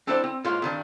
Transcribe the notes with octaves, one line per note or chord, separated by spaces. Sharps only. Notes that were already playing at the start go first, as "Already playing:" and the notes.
C4 D4 E4 A4 C5 D5
C4
G#2 A#3 F4 C#5 C6
G2 D#3 D4